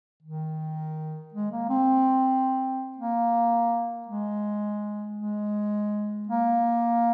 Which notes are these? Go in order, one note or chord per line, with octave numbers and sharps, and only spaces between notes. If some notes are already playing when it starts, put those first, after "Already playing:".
D#3
G#3
A#3
C4
A#3
G#3
G#3
A#3